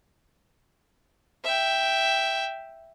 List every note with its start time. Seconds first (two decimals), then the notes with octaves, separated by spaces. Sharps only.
1.44 E5 G5